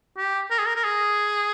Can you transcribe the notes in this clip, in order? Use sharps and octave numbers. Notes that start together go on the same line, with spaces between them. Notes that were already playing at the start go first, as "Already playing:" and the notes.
G4
A#4
G#4
A#4
A#4
G#4